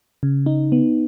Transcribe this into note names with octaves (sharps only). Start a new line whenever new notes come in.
C#3
D#4
B3